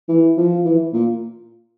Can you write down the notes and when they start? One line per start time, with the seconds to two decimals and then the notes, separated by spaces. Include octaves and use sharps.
0.08 E3
0.37 F3
0.65 E3
0.93 A#2